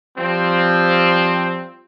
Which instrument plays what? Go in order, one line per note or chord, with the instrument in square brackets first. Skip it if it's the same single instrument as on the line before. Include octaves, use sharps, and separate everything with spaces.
[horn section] F3 G3 C4